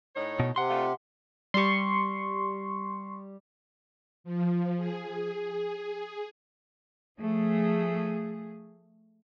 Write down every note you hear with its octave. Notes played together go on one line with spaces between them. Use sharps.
A2 D#4 C#5
B2
C3 F#5 C6
A3 D4 F4
G3 G4 C6 C#6
F3
G#4
F3 A3 G#4